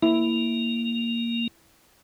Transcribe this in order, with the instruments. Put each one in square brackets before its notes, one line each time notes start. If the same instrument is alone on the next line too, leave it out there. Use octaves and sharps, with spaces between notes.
[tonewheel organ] A#3 [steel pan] E4